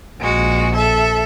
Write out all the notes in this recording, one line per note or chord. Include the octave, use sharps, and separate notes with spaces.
A#1 G#3 F#4
A4 E5